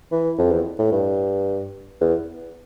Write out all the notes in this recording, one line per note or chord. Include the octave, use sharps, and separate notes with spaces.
E3
F2
E2
A2
G2
E2